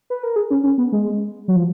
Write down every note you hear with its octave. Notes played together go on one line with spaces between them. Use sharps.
B4
A#4
G#4
C#4
C#4
B3
G#3
F#3
F3